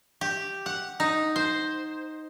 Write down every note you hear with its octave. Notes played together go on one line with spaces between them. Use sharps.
G4
F#5
D#4
C5